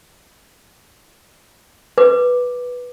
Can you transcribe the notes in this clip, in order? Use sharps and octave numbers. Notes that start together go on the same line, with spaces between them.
B4 D6